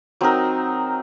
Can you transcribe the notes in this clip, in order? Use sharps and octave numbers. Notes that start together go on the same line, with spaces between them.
F#3 C4 D#4 A#4